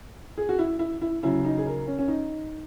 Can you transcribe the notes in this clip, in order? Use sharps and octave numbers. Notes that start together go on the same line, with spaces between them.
G#4
F#4
E4
E4
E4
C#3 F#3 E4
D#4
G#4
A#4
C#4
C#4
D#4